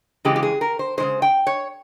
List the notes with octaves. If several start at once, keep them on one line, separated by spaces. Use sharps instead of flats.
C#3 E3 G#3 G4
G4
G#4
A#4
C5
C#3 E3 G#3 C5
G5
C#5